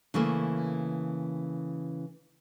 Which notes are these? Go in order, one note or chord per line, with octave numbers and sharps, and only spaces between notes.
C#3 E3 A3 A#3